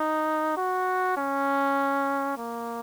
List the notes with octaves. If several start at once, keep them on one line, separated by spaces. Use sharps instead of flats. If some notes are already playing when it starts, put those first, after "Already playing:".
Already playing: D#4
F#4
C#4
A#3